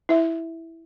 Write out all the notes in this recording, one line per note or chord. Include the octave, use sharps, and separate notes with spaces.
E4 E5